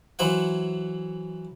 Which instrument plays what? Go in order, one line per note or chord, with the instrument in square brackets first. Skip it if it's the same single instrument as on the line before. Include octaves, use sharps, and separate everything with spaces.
[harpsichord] E3 F#3 C5 E5 F#5